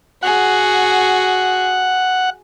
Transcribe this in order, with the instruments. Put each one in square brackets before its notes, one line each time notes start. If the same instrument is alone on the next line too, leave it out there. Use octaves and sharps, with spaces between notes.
[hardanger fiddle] F#4 G#4 [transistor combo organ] F#5